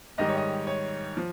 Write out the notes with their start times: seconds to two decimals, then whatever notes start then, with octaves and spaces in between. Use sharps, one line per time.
0.18 G#2 D#3 G3 D#5
0.28 C#5
0.37 D#5
0.67 C#5
1.17 F3